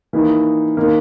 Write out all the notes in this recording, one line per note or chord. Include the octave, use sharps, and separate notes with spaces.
E3 A#3 D#4
D#3 A#3